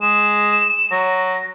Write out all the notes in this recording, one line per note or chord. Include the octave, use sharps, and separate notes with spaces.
G#3 E7
F#3 A#6